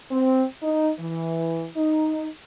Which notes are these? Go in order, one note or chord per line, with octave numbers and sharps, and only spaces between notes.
C4
D#4
E3
D#4